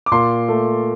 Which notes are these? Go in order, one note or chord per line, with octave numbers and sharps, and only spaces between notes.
D6
A#2 C6
A3